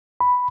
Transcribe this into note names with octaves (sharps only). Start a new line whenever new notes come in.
B5